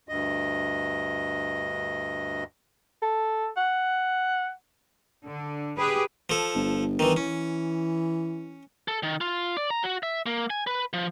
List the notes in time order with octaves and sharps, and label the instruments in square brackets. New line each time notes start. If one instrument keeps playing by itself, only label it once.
[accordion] D2 G2 D#5
[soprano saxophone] A4
F#5
[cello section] D3
G4 G#4 B4
[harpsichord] F3 A4
[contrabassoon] G1
[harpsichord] D#3 E3
[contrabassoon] E3 [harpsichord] C#4
[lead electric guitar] A4
D#3
F4
D5
A#5
F#4
E5
A#3
G#5
B4
F3